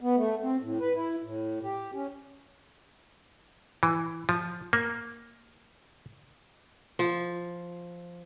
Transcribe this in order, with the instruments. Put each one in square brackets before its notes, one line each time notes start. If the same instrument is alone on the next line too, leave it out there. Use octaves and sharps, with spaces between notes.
[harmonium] B3
A3
C4
A2
B4
E4
A2
G4
C#4
[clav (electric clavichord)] E3
F3
A#3
[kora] F3